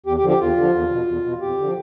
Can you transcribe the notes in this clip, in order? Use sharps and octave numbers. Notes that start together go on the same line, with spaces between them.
E2 G4
G4
D3 F3
G4
E2 F4
D3 F3
E2
B2
E2
B2
F2 G4
D3
F3